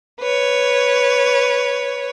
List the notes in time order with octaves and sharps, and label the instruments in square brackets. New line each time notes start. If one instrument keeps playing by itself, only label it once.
[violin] B4 C#5